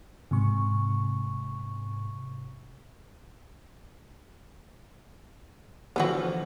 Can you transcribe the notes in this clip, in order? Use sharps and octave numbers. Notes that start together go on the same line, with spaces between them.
G#2 C3 C#6
D3 E3 F3 B3 F#4